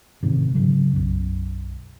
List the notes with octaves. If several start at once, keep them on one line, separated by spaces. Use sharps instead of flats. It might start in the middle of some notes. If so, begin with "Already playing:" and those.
A1 G#2 C3 D#3
G#2 C#3 F#3
B1 F#2